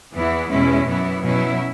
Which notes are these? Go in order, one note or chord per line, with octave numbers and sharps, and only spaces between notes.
E2 E3 B3 E4
E2 B2 G#3 C#4 E4
F#2 E3 B3 E4
B2 F#3 C#4 E4